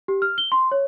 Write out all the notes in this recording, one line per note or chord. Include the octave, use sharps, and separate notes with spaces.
G4
F6
G7
C6
C#5